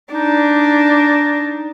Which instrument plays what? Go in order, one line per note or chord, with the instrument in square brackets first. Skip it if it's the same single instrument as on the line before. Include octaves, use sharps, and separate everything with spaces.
[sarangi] D4 [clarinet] D#4